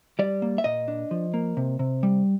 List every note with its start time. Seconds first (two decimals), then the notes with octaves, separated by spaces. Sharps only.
0.19 G3 D5
0.42 A#3
0.58 E5
0.64 A#2 D#5
0.88 D4
1.11 F3
1.34 A#3
1.57 C3
1.79 C3
2.03 G3